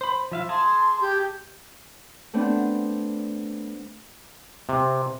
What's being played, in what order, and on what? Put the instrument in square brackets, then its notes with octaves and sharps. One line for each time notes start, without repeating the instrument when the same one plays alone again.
[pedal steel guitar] C5 B5
F3 E5 F5
[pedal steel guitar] G#4 A5 [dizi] C6
[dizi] G4
[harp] A3 B3 C4 D4
[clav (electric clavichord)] C3